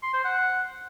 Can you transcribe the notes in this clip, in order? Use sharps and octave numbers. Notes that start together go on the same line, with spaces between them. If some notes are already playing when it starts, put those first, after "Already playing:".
C6
C5
F#5